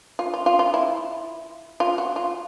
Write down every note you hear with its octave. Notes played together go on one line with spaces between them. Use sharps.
F4
F4
F4
F4
E4
F4
F#4
F4